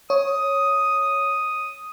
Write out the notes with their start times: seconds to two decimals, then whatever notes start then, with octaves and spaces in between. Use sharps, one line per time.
0.10 C#5 D#6